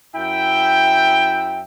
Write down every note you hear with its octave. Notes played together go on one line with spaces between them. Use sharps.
F#2 E4 E5 G5